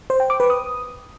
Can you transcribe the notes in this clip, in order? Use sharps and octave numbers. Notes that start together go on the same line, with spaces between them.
C5
G5
D6
B4
D#6